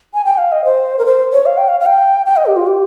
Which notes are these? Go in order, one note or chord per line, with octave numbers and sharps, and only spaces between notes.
G#5
G5
F5
D#5
C5
A#4
C5
C#5
F5
G5
F5
F5
G5
G5
D#5
G4
F4
G4